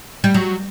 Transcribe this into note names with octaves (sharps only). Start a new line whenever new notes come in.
G3
F#3